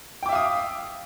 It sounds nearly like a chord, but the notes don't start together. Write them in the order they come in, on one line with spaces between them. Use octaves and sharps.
G5 D6 E5 F5 D#6